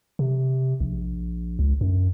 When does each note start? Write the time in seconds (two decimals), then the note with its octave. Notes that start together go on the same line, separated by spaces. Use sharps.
0.19 C3
0.81 A#1
1.59 C#2
1.81 F#2